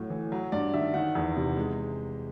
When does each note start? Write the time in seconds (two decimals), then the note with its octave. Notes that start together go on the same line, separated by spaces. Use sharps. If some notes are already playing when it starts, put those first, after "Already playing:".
Already playing: A2 F#3 A3
0.10 E3
0.32 F#3
0.52 G2 D5
0.74 D#3 E5
0.94 D#3 F#5
1.15 E2
1.37 C3
1.57 G#3